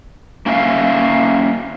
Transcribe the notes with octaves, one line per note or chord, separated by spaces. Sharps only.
A#3 C#4 F#4 E5 F5